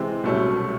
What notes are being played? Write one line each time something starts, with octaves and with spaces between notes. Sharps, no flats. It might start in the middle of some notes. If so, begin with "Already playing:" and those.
Already playing: C3 E3 G#3 C4
C2 B2 F#3 A3 C#4